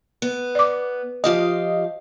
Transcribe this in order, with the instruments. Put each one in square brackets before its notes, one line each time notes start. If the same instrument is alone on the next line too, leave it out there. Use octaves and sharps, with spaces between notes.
[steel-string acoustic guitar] B3
[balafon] D5 D6
[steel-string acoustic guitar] F3 G4 F5 [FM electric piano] F4 D#5